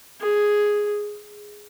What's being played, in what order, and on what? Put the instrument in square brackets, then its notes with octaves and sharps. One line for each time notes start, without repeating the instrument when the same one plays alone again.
[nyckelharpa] G#4